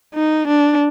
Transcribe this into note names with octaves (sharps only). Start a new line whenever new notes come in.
D#4
D4